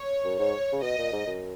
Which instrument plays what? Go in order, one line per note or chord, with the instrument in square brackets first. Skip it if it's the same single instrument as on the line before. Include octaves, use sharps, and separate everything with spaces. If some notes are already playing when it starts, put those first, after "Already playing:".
Already playing: [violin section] C#5
[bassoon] F#2
[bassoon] G#2 [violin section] C#5
[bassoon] C#3
[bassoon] B2 [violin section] D#5
[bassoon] A#2
G#2
F#2